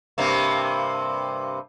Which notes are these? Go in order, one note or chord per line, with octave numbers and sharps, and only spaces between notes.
G2 C3 A#3